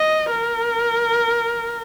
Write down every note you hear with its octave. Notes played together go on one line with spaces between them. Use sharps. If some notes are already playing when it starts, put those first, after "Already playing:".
Already playing: D#5
A#4